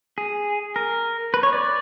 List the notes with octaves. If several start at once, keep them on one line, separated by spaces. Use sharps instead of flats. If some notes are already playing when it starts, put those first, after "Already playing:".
G#4
A#4
B4
C#5
D5